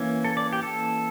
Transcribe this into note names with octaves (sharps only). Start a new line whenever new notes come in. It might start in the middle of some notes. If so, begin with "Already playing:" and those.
Already playing: E3 A#3 C#4
A4
D5
G4
A4